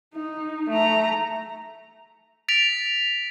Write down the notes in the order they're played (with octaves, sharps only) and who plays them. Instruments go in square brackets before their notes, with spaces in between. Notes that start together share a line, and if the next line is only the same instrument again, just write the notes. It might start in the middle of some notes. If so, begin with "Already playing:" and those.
[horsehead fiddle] D#4
A3 A#5
[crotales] A6 B6 D7 F7